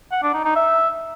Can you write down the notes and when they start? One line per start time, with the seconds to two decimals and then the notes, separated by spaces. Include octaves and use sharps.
0.12 F#5
0.23 D4
0.34 D#4
0.45 D#4
0.55 E5